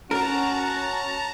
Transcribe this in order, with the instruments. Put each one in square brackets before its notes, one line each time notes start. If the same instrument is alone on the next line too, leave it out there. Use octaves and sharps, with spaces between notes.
[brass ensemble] C#4 F#4 [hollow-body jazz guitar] A#4 [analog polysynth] A5 A#5